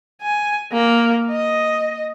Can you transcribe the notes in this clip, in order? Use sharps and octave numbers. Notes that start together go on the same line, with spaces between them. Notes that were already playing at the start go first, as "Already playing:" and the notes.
G#5
A#3
D#5